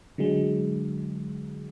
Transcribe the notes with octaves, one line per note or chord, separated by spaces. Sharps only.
D3 F#3 G#3